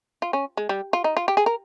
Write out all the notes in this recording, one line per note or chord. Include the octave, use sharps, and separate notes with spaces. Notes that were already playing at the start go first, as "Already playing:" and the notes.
F4
C#4
G#3
G3
F4
D#4
F4
G4
G#4
A#4